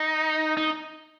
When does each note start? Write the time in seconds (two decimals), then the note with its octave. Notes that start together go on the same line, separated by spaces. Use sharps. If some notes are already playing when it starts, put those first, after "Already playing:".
Already playing: D#4
0.57 D#4